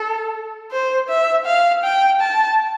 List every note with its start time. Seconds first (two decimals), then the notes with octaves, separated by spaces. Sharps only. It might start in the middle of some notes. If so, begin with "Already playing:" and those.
Already playing: A4
0.72 C5
1.09 E5
1.46 F5
1.84 G5
2.21 A5